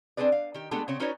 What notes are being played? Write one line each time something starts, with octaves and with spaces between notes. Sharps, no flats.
C4 D4 G#4 B4 D5
F5
D#3 G4
G#3 A3 B3 D4 G4 A4
C#3 C4 C#5
C#4 D#4 F#4 B4 C#5 D5